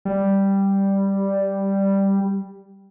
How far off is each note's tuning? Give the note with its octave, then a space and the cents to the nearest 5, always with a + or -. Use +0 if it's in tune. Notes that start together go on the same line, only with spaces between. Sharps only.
G3 +0